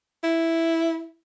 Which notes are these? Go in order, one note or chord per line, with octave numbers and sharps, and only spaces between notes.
E4